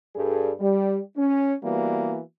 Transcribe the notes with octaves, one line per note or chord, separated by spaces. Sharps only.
G2 G3 G#4 A4
G3
C#4
E3 G3 A#3 B3 F#4